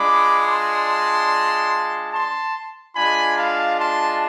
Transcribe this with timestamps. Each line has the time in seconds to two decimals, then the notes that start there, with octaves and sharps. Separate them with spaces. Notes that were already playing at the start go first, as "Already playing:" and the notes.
Already playing: G#3 D4 F4 B5 D6
0.47 A5 C6
2.13 A5 C6
2.96 G#3 D4 F4 G#5 B5
3.37 F5 A5
3.79 A5 C6